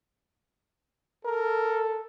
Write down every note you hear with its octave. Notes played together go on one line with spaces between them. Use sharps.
A4 A#4